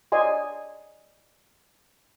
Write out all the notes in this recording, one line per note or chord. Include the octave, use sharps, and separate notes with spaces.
D5 D#5 G#5 C6